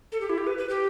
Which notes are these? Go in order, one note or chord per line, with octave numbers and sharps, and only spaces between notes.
A4
G4
E4
G4
B4
B4
G4